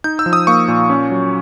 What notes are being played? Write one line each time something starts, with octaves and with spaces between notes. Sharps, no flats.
D#4 G6
E6
F3
D#6
A#3 C#6
A#2
C#4
F#3